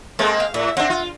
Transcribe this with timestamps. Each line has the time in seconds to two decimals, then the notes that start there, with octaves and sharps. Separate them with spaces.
0.19 G#3 A#3 C4 A4
0.40 F5
0.54 A2 E5
0.77 C4 D4 E5 F#5
0.90 F4